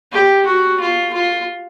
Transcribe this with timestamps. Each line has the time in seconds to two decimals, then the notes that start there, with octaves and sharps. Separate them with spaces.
0.12 G4
0.45 F#4
0.80 F4
1.13 F4